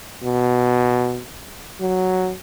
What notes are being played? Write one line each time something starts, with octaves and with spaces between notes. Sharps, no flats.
B2
F#3